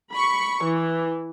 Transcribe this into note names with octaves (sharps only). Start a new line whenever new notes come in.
B5 C#6
E3